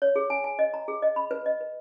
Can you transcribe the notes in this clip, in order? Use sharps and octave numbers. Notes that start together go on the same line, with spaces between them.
C#5
G#4
G#5
G#5
D#5
A#5
G#4
D#5
B5
B4
D#5
B4